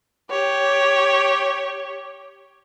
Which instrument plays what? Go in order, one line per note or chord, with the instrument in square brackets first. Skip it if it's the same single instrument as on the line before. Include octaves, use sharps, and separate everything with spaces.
[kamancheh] G4 C#5